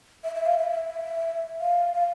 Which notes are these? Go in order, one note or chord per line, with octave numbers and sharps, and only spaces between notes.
E5
E5
F5
E5
E5
F5
F5